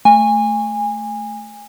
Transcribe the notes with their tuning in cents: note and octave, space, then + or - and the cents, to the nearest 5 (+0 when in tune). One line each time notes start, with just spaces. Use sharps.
A3 +0 G#5 -20